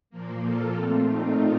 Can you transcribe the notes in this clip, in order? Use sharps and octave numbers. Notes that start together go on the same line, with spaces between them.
A#2 F3 A#3
F4 A4
A#2 A3 C4 F4 A4
D#4